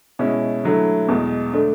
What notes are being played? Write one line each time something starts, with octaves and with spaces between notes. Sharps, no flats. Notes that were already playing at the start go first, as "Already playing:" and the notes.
B2 G#3 C#4 E4
D3 F#3 A3 E4
E2 B2 G#3
D3 A3 D4